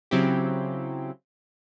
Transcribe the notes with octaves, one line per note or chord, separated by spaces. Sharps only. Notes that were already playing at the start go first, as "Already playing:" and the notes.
C#3 F#3 C4 E4 G4